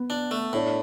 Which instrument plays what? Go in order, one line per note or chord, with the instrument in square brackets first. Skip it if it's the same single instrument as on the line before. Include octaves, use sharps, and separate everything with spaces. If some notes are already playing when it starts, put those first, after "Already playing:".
Already playing: [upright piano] B3
[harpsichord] D4
A3
[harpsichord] A2 [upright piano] D4